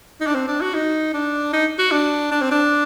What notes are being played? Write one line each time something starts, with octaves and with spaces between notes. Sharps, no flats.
D#4
D4
C4
D4
F#4
D#4
D4
D#4
F#4
D4
D4
C4
D4